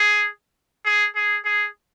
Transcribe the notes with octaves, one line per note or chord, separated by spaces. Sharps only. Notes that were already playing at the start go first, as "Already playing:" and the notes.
Already playing: G#4
G#4
G#4
G#4